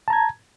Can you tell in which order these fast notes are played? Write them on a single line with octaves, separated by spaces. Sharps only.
A5 A#5 G#6